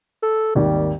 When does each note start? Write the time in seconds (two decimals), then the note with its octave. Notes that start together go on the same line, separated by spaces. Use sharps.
0.23 A4
0.55 G#1 D#2 G3